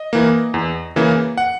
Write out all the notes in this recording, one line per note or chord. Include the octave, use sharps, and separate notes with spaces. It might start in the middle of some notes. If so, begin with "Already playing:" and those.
Already playing: D#5
E3 A#3
E2
C#3 E3 A#3
F#5